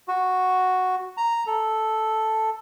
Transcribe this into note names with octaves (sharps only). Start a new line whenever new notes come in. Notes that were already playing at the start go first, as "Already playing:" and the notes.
F#4
A#5
A4